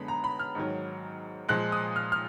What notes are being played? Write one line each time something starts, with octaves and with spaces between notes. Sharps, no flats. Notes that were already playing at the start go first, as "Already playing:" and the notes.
Already playing: F#2 D3 G#3 B3 B5
A#5
B5
F6
G#2 D#3 F#3
A#2 F3 G#3 F#6
D#6
F6
F6